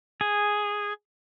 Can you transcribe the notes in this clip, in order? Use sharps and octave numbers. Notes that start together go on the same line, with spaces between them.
G#4